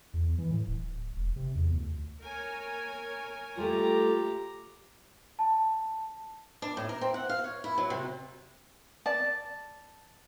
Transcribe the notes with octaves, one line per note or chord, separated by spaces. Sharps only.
E2
E3
A2
D1
E1
C3
E2
D2
A#4 C#5 G#5
G3 A3 F4 G4 A#5
A5
D4
A2
A#4
C4
F#5
F5
C#5
E4
F#3
C3
D5 A5